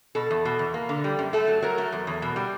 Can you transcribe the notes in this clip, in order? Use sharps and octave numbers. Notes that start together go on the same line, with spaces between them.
B2 A4
E2
B2
E2
A#3
D3
G3
F#2
A3 A4
F#3
F#3 A#4
A3
E2
E2
B2
G3